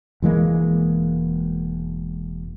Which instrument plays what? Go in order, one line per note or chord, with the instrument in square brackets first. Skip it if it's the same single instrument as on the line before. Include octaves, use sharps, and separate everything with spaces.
[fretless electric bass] E1 E3 G#3 A#3